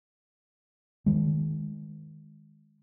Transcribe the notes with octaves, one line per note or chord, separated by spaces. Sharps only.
D#3 G#3